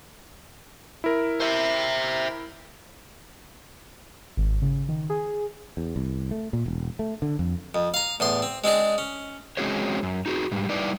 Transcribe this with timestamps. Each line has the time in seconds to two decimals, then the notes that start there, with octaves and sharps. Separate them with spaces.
1.04 E4 A#4
1.41 C5 E5
4.37 G#1
4.62 C#3
4.89 D#3
5.10 G#4
5.77 E2
5.96 C2
6.31 A3
6.53 A#2
6.66 E1
6.99 A3
7.22 D3
7.39 F2
7.75 F2
7.94 F5 A#5
8.20 E2 A2 C6
8.42 C4
8.64 G#3 C4 D4 G#4
8.98 C#4
9.57 G#3 C4 C#4 F#4 G#4 C#5
10.03 F#2
10.26 D#4 F#4 G#4
10.52 G#2 G3
10.69 G3 D#4 E4 B4 D5